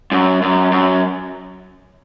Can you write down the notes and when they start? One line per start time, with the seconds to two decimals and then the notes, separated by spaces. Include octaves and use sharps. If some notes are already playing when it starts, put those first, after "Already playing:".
0.12 F#2
0.42 F#2
0.72 F#2